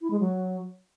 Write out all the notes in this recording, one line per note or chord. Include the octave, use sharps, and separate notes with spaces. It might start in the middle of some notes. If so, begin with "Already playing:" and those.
E4
G#3
F#3